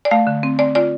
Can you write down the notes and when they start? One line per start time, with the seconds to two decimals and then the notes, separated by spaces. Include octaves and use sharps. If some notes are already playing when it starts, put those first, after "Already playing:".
0.05 D5
0.11 A3 F5
0.27 D3
0.43 C4
0.59 C4 D5
0.75 F4 D5